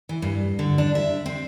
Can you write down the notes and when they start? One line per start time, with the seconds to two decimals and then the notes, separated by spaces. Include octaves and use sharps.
0.09 E3
0.22 G2
0.59 D3
0.78 D4
0.95 E5
1.26 C4